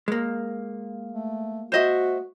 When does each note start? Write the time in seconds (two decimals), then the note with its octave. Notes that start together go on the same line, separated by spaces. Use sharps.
0.08 G#3 A#3
1.12 A3
1.72 F#4 C5 D#5 E5